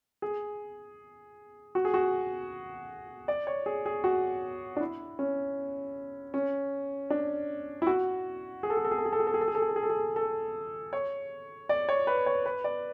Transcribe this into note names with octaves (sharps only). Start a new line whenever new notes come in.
G#4
F#4
G#4
F#4
D5
C#5
G#4
G#4
F#4
D4
E4
C#4
C#4
D4
E4
F#4
G#4
A4
G#4
A4
G#4
A4
G#4
A4
G#4
A4
G#4
A4
G#4
A4
G#4
A4
G#4
A4
G#4
A4
C#5
D5
C#5
B4
C#5
B4
D5